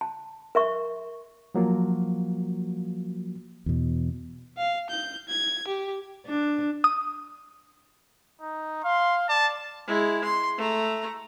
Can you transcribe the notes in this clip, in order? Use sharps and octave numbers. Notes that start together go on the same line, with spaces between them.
A5
A#4 E5 C#6
F3 F#3 A#3 F4 F#4
E2 B2
F5
G6
G#6
G4
D4
D#6
D#4
F5 C6
D5 A5
G#3 E4
C6
A3 A#5